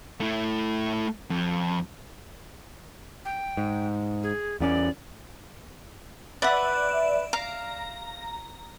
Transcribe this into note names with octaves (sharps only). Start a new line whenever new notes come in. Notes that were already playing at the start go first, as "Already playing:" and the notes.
A3 E4
F2
G5
G#2
G#4
E2 B3 C#4 D5
B4 D5 E5 F#5
F5 A#5